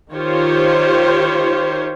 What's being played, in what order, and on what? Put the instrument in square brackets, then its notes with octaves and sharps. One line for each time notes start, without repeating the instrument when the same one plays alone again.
[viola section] D#3 F4 G4 C5 C#5